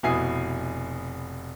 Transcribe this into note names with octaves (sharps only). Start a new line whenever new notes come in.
F1 B2 E4 G#5 D#6 C7